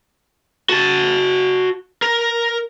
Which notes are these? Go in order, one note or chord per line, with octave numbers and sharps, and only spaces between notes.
F#4 A5
A#4